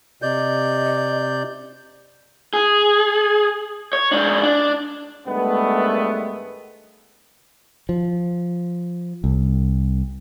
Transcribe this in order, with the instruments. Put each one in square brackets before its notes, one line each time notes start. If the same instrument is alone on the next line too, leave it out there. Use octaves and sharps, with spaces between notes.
[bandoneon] C3 D5 G6 [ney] D#5
[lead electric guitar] G#4
C#5
G#2 D4
D4
[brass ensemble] G2 D#3 G#3 A3 B3
[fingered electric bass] F3
C2